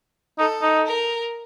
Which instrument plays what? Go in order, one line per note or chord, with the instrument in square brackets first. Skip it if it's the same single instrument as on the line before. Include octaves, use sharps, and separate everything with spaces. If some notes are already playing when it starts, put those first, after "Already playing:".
[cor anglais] D#4 [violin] A4
[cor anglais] D#4
[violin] A#4